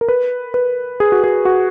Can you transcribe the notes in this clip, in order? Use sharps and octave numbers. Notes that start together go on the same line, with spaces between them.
A#4
B4
B4
G#4
F#4
G#4
F#4